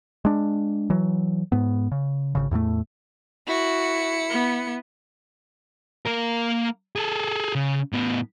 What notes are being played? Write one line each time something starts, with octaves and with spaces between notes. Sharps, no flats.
G#3 D4
E3 F#3
G#2 B3
C#3
G#1 D#2 C#3
E2 A2 D#3 A3
E4 F#4 C#7
B3
A#3 A#4
G#4 A4
C#3
A2 B3